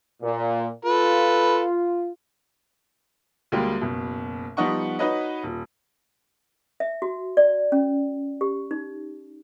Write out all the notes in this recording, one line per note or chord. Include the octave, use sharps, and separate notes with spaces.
A#2
F4 A4 B4
D2 G3 G#3 A#3 G5
F#1 B2
F3 G3 B3 D#4 F#5 C#6
D#4 F#4 B4 C#5 D#5
D#1
E5
F#4
D5
C#4
G4
D#4